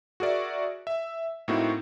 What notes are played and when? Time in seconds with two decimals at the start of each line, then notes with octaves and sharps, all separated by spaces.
0.20 F#4 G#4 A#4 D5 E5
0.87 E5
1.48 A2 A#3 C4 D#4 E4 F#4